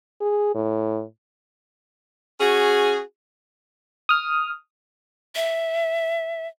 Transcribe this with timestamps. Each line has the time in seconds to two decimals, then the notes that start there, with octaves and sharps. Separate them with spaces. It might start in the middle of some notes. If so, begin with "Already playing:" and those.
0.21 G#4
0.55 A2
2.40 C#4 F#4 G#4
4.09 D#6 F6
5.35 E5